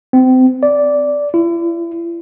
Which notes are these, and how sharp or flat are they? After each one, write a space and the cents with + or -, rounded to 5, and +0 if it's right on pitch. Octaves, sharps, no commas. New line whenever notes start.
C4 -30
D5 -10
E4 +40